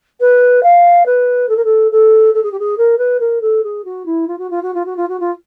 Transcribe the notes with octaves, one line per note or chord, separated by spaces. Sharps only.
B4
F5
B4
A4
A#4
A4
A4
A4
G#4
G4
G#4
A#4
B4
A#4
A4
G#4
F#4
E4
F4
F#4
F4
F#4
F4
F#4
F4
F#4
F4